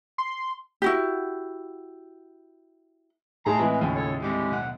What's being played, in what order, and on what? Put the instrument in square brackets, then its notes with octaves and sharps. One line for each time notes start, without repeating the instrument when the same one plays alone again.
[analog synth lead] C6
[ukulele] E4 F#4 G4
[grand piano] A2 G#4 [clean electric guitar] G3 D#4 A5 [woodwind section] D#5 A#5 C6
[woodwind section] E3 [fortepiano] G#3 E4 [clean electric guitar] C4
[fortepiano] D#2 [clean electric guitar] C#3 C#4 F4
[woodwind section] A4 C#5
[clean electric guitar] D3 G3 C4 [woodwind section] G#3 G4
[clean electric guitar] B1 D3 F#5